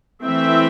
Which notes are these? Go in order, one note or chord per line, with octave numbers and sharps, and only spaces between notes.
E3 A3 C4 E5 G5